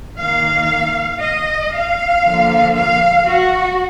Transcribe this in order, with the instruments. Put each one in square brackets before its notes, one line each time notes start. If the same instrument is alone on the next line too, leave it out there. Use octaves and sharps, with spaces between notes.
[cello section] D#3 A#3 F5
D#5
F5
D3 F3 A#3
F5
F#4